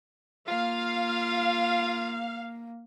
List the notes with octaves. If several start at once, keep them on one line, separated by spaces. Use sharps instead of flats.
A#3 F4 F5